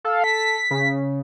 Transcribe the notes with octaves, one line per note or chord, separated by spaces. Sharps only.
A4 F5
B6
C#3